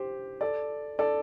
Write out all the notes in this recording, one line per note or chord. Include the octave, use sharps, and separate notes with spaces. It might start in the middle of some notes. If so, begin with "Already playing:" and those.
Already playing: G4 C5
A4 D5
A4 D5